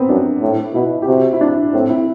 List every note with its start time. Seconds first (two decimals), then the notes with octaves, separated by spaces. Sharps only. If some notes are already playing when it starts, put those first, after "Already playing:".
Already playing: B3 C4
0.09 F#2 D4
0.42 A2
0.74 B2 E4
1.02 G4
1.07 C3 F#4
1.33 E4
1.41 D4
1.73 A2 C4
1.90 E4